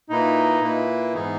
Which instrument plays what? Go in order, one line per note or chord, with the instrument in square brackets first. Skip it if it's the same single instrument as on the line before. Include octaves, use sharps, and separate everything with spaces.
[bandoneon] A#2 A#3 E4 B4 [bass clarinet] D#4
[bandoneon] A#2 A#3 E4 B4
G#2 E3 B3 D#4 G#4